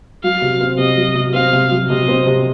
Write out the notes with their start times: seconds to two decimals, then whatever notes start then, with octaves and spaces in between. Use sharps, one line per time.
0.24 F#3 F5
0.42 C3
0.61 C4
0.78 C3 D#5
0.97 F#3
1.15 C3
1.34 C4 F5
1.53 C3
1.71 F#3
1.90 C3 D#5
2.08 C4
2.27 C3